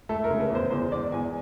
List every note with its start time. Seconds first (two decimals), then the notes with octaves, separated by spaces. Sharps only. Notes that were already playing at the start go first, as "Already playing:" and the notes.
0.09 A3 A4
0.24 A#4
0.30 C#3
0.40 B4
0.50 E2 C5
0.71 E2 C5
0.92 E2 D5
1.12 E2 G#5